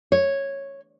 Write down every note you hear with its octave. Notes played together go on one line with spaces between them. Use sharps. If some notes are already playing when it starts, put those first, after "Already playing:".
C#5